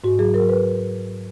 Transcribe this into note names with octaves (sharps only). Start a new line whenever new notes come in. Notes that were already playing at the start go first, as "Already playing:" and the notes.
G#2 F#4
F#3 G#4
F#3 A#4
B4